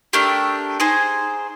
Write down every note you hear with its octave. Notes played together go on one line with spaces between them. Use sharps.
A3 D4 G4 A#4
D#4 G#4 C5